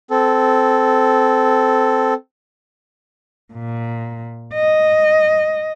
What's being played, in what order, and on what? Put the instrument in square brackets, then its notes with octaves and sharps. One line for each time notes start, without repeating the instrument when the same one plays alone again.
[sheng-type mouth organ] C4 A4
[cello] A#2
D#5